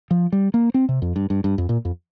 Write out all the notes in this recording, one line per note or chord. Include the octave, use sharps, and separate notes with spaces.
F3
G3
A#3
C4
C3
F2
G2
G2
G2
F2
A#2
F2